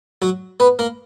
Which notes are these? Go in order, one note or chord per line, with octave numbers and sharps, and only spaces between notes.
F#3 F#4
B3 B4
A#3 A#4